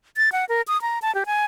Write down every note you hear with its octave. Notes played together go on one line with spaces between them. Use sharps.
A6
F#5
A#4
D#6
A#5
A5
G4
G#5